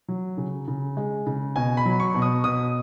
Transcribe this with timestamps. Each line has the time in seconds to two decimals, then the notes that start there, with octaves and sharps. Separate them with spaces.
0.08 F#3
0.37 C#3
0.68 C#3
0.97 G#3
1.26 C#3
1.56 B2 G#5
1.77 B5
1.86 F#3
2.00 C#6
2.14 B2
2.22 D#6
2.44 B2 D#6